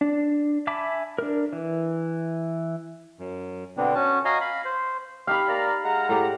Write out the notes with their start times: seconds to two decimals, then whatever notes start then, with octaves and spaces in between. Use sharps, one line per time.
0.01 D4
0.67 E5 G#5 A5 B5 D6
1.18 D4 A#4
1.53 E3
3.19 F#2
3.77 B2 D3 B3 C4 D4
3.95 C#4 F#4 A5
4.25 F#4 D#5 F5 G#5 A#5
4.41 F5 B5
4.65 C5
5.27 D#4 G4 F5 B5
5.48 A#3 D5 A#5
5.84 G#3 F#5 A#5
6.09 A2 G4 D5